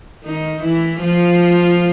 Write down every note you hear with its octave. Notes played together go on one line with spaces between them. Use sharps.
D#3 D#4
E3 E4
F3 F4